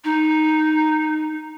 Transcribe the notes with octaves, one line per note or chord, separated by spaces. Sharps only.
D#4